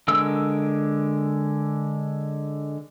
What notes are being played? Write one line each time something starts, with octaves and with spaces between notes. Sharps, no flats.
D3 G#3 A#4 E6